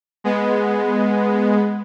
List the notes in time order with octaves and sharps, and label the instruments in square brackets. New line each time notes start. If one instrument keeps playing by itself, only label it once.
[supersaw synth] G#3 B3